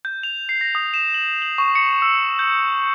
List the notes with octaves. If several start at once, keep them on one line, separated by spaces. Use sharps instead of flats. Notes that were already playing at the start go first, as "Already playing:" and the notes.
G6
F7
C7
A#6
D#6
E7
F#7
F#7
C#6
C#7
E6
G6